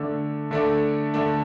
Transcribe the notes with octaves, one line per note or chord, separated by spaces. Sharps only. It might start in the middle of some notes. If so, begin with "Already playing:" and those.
Already playing: D3 A3 D4
D3 A3 D4
D3 A3 D4